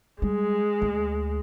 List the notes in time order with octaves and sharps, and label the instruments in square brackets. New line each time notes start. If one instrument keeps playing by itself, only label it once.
[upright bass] G3 [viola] G#3
[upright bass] D2